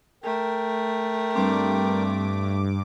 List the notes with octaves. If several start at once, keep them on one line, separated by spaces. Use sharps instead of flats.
A3 A#4 G5
G2 G3 C4 D6